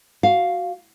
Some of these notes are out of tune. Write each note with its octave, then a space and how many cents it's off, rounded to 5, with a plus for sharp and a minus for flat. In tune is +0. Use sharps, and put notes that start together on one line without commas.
F#4 +0 F5 +0